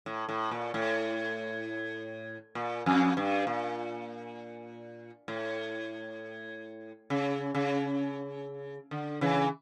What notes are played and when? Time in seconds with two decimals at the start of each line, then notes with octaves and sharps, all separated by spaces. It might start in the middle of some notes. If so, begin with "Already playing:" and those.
0.06 A2
0.29 A2
0.51 A#2
0.74 A2
2.55 A#2
2.86 F2
3.17 G2
3.47 A#2
5.28 A2
7.10 C#3
7.55 C#3
8.91 D3
9.21 C#3 E3